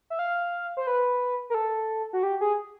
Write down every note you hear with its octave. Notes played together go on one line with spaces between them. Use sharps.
E5
F5
C5
B4
A#4
A4
F#4
G4
G#4